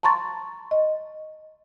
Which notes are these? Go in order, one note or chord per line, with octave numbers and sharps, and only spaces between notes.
A5 A#5 C6 C#6 A6
D#5